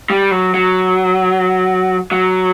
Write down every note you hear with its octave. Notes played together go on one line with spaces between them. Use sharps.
G3
F#3
F#3
F#3